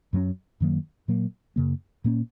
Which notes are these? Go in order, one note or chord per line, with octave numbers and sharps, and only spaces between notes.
F#2 F#3 A#3 C#4
F#2 D#3 F#3 A#3
A#2 F#3 A#3
F#2 C#3 A#3
A#2 A#3 C#4